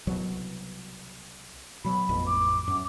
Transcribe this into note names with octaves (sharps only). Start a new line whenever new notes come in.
C2 B2 F#3
B2 F#3 B5
A1 F2 B2
D6
F#2